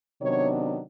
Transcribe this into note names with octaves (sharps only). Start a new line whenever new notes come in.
C3 D#3 F#3 B3 D4 C#5